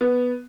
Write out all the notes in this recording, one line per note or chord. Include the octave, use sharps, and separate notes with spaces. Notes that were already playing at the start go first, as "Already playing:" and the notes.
B3